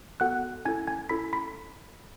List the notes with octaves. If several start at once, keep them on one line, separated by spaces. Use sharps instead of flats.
B3 F#4 A4 F#5 F#6
C#4 E4 A4 G#5 G#6
G#5 G#6
C#4 E4 A4 B5 B6
B5 B6